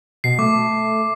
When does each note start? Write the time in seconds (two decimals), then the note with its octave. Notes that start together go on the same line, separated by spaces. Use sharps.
0.24 B2 C7
0.39 A3 D6